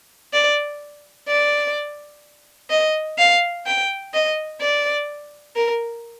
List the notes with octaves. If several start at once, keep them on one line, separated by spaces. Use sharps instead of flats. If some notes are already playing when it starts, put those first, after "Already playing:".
D5
D5
D#5
F5
G5
D#5
D5
A#4